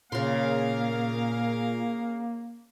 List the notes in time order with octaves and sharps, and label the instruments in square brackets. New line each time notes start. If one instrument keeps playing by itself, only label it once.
[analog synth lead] A#2 [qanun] C#3 C6 [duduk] A#3 [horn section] G#4 A#4 F5